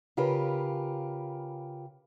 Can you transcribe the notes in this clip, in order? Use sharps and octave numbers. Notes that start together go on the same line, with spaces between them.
C#3 F4 G4 A#4 B4